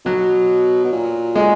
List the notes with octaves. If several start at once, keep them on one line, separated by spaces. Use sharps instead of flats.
B2 F#3
B2
A#2
G#3